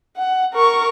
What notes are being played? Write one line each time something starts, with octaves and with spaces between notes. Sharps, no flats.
F#5
A#4 C#6